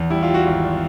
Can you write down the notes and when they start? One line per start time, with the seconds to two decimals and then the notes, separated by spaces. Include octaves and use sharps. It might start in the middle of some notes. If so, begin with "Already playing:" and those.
Already playing: E2
0.10 G3 E4
0.23 F4
0.29 G3
0.34 F#4
0.46 G#1 F#4